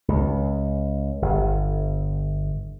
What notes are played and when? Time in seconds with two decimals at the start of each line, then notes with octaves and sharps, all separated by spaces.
0.08 C#2
1.22 G1